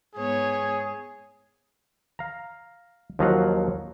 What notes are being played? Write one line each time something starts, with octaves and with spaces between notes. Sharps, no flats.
G#2 B3 G#4 C#5
F5 A#5
D#2 F3 F#3 D#5 F5 F#5